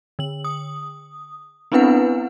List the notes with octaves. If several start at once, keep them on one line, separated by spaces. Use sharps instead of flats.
D3 F#7
D#6
B3 C4 D4 E4 B4 F#5